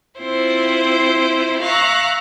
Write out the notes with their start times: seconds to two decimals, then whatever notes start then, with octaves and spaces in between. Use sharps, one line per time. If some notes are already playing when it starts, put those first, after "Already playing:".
0.18 C4 E4 F4 C5
1.60 E5 F5 A#5 C#6 F#6